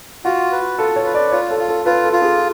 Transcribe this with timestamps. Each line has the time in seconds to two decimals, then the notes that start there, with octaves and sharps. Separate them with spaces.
0.25 F4 F#4
0.52 B4
0.78 F4 A4
0.96 C#5
1.06 B4
1.15 D5
1.32 F4 C#5
1.51 A4
1.59 F4
1.68 A4
1.86 F4 B4
2.04 A4
2.13 F4
2.22 G#4